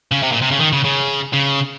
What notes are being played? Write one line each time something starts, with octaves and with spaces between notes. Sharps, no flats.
C#3
C3
A#2
C3
C#3
D#3
C#3
C#3
C#3